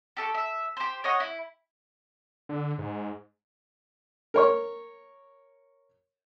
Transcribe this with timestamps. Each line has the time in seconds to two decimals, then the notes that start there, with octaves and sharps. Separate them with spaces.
0.17 G4 A4 C#6
0.34 E5
0.77 G4 C5
1.04 C#5 D#5 F#5
1.20 E4
2.49 D3
2.78 G#2
4.34 A#4 C#5 C#6